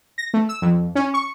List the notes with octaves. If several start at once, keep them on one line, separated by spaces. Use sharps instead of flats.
A#6
A3
E6
F2
C#4
C#6